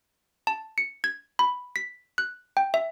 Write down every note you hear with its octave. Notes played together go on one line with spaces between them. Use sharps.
A5
C#7
G#6
B5
B6
F#6
G5
E5